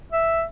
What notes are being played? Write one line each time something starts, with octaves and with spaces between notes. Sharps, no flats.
E5